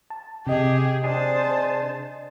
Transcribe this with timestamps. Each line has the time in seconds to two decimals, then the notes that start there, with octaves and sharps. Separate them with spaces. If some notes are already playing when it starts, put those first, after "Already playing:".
0.10 A5
0.47 C3 G4 G#4 D#5
1.04 D4 G#4 C5 A5